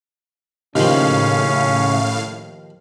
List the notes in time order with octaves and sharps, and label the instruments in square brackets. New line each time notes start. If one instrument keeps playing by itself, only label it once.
[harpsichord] D#2 F3 [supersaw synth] A2 F5 [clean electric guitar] C#3 [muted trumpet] C#4